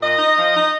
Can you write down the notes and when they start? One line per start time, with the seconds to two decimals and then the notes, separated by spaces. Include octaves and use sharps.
0.01 A#2 D#5
0.19 D#4
0.36 F3
0.53 D#4